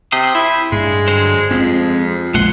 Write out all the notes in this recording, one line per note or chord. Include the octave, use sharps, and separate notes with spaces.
C3 G5 C6 D#6
E4
G2 G#3
D3 F#3 C5
F2 F3 G#3 C4 C#4
A#1 F3 G#3 A#3 F#5 C6